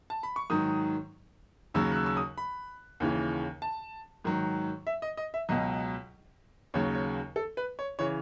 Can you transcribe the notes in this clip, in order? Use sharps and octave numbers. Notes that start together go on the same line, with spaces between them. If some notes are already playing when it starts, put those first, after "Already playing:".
A5
B5
C#6
G#2 D#3 F#3 D#6
D#2 C#3 F#3 E6
F#6
E6
E6
D#6
B5
D#2 C#3 E3
A5
G#2 D#3 F#3
E5
D#5
D#5
E5
C#2 B2 F#3 D#5
D#2 C#3 F#3 C#5
C#5
A4
B4
C#5
C#3 E3 C#5